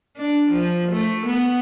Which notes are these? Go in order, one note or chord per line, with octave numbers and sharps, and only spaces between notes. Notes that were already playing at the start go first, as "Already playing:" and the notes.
D4
F3
A3
B3